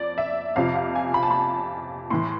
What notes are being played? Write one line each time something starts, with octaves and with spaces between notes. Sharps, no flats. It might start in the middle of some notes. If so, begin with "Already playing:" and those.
Already playing: F2 F3 D5
E5
F2 C3 F3 F5
F5
G#5
B5
A5
B5
A2 E3 C6